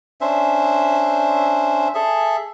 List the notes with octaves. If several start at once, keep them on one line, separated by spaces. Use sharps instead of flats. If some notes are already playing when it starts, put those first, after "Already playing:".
C#4 D4 C5 E5
G#4 A4 E5